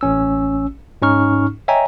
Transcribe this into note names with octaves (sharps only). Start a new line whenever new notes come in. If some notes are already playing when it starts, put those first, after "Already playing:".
A1 C#4 E6
G#2 C#4 D#4 C#6 F6
C#5 D#5 E5 G5 G#5 A#5